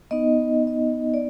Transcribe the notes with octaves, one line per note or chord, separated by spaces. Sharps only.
B3 D#4 D#5
D#5
D5